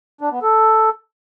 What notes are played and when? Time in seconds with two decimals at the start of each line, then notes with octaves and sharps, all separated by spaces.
0.21 D4
0.32 B3
0.43 A4